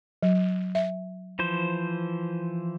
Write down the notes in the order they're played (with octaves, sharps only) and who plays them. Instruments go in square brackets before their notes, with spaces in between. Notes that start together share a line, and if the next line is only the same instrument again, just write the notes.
[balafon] F#3
E5
[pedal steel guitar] E3 F3 C5